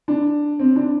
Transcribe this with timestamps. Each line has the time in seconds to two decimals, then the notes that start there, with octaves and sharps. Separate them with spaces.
0.08 D4
0.59 C4
0.76 D4